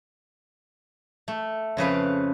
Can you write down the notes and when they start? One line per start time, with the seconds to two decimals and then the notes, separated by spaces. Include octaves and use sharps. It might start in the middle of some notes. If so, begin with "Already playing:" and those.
1.28 A3
1.77 F2 C#3 B4 F5